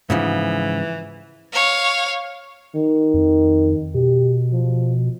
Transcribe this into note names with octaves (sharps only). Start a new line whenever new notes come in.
G#2 C#3 E3 F3
C#5 F5
D#3
F2
B2 G4
F3